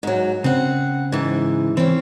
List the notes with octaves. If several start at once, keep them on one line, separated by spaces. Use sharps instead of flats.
G#2 F#3
C#3 C4 F#5
G#2 E3
E3 C4 C#4